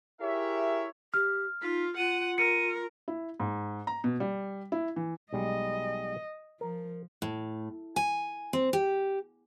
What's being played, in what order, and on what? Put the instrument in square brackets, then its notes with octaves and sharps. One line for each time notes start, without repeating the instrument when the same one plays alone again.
[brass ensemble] E4 G4 G#4 A#4 C#5 E5
[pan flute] G4 [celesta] F6
[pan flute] D#4 [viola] F4 [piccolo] B6
[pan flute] F4 [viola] F#5 [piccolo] D#7
[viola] A#4 [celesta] C#7 [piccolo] D#7
[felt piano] E4
G#2
A#5
B2
G3
E4
E3
[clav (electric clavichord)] B1 G3 G#3 [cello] D#5
[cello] F3 [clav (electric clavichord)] A#4
[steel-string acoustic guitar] A2
G#5
C4
G4